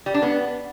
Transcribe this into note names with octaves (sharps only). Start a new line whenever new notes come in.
G3
D4
B3